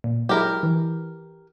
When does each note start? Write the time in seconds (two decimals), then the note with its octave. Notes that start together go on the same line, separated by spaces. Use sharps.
0.04 A#2
0.29 F#3 G#3 E4 G4 A#4
0.63 E3